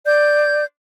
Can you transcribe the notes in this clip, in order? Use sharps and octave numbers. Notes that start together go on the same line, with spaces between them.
D5 G6